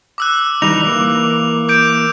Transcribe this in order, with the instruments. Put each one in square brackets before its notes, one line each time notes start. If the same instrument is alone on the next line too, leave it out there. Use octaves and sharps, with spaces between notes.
[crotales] D6 E6 F#6
[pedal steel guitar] E3 G3 D#4 [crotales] F7
[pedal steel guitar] E3 A#3
[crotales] D6 G6 D7